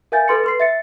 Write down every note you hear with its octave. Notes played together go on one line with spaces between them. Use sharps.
A#4 E5 F5 G#5 G6 A6
A4 B4 C6 A6 C#7
B4 C6 C7
E5 A6 C#7